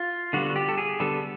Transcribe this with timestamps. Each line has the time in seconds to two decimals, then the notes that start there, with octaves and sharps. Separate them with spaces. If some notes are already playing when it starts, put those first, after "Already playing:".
Already playing: F4
0.33 D3 G3 B3 F#4
0.56 G4
0.69 A4
0.78 G#4
1.00 D3 G3 B3 A4